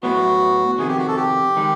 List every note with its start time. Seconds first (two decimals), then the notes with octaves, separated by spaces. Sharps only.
0.03 A2 F#3 B3 F#4
0.78 F2 C3 D#3 G#4
0.88 G4
0.98 F#4
1.08 A4
1.16 G4
1.56 D#3 G#3